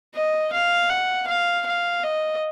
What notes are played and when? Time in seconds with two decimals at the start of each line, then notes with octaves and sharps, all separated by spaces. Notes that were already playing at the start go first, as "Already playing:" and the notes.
0.15 D#5
0.53 F5
0.90 F#5
1.28 F5
1.66 F5
2.04 D#5